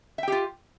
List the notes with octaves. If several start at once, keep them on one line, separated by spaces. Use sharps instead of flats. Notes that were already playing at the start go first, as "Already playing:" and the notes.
F4 G4 E5 G5